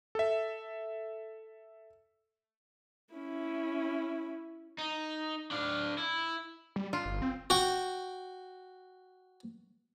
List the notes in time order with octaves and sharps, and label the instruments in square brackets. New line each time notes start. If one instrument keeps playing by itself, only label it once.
[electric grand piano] A4 E5
[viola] C#4 E4
[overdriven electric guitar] D#4
D4 F5
E4
[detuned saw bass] G3
[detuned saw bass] D4 [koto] F4
[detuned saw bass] G1
C4
[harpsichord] F#4 G5